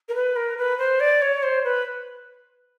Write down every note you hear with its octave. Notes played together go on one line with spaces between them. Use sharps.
A#4
B4
A#4
B4
C5
D5
C#5
C5
B4